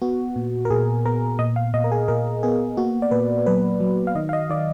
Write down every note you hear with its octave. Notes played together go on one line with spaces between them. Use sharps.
B3 F#4
A#2
A#4
A#2 G#4
B3 A#4
A#2 D#5
F5
A#2 D#5
A#4
G#4
A#2 A#4
B3 G#4
A#3 F#4
D5
A#2 B4
F#3 B4
F#3
F5
D#3 D#5
F5
D#5
D#3 D5